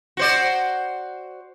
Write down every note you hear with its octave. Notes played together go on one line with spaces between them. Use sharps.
F#4 C5 D5